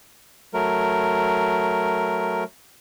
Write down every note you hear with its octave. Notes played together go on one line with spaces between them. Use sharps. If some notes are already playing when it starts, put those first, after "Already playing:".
F#3 A3 A#4